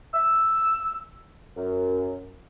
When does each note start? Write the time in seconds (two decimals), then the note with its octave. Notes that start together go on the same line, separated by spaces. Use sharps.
0.14 E6
1.56 F#2